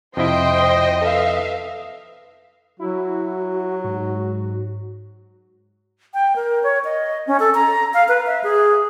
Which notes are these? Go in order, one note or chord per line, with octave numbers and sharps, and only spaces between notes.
F2 C3 E4 C5 D#5 G5
A4 B4 E5 F5
F#3 E4 F#4
G#2
G5
A#4
C#5
D#5
C#4
A4
A#5
F5
B4
E5
G#4